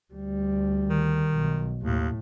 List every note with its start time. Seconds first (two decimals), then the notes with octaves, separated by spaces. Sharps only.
0.13 D2 G3
0.89 D#3
1.31 B1
1.82 D#2 A2